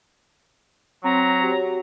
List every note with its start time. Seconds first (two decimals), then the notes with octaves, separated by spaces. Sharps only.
1.04 F#3 C4 A#5
1.41 F#4 G4 C#5